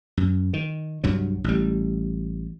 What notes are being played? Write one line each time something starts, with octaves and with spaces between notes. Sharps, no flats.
F#2
D#3
C2 G2 F#3
A1 G3